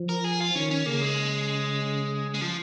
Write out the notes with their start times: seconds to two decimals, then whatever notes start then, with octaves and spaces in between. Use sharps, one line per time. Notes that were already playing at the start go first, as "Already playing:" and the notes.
Already playing: F3
0.09 A#4
0.24 G#4
0.40 F4
0.55 D#3 C#4
0.71 C#4
0.86 C#3 A#3
1.01 G#3
2.34 G#3
2.41 F3